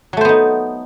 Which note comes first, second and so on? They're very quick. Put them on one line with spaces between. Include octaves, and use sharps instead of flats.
F#3 A3 C5 B3 D#4